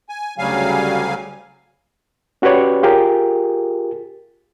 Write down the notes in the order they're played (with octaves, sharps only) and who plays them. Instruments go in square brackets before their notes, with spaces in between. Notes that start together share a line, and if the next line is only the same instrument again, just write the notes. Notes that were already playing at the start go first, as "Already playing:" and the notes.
[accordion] G#5
D2 C#3 F#3 G3 F5 G#5
[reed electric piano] C#4 F#4 G4 B4 C#5 D5
F4 G4 G#4 A#4